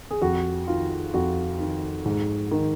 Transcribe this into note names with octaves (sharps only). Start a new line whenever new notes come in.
G#4
F2 F#4
D#3 F4
F2 F#4
D#3
G#2
D#3